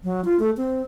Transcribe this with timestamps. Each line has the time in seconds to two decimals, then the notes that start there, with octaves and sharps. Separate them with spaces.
0.04 F#3
0.25 F4
0.40 A3
0.57 C4